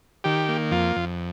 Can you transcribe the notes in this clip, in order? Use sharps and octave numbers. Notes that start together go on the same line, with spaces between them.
D#3 G4
A#3
F2 F4
F2